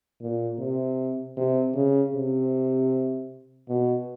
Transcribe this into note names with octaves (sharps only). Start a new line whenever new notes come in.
A#2
C3
C3
C#3
C3
B2